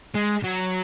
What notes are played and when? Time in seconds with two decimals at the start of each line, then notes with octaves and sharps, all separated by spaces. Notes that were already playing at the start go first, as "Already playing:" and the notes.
0.15 G#3
0.44 F#3